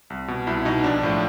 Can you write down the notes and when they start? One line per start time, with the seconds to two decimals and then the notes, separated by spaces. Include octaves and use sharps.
0.10 C2
0.28 B2
0.47 C2 E4
0.65 B2 D#4
0.84 A#1 D4
1.03 A2 F3